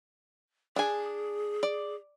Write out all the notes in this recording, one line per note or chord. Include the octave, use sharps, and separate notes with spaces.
D4 G#4 G#5
D5